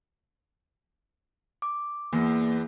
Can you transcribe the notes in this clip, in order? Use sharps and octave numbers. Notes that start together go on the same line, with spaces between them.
D6
E2 A#3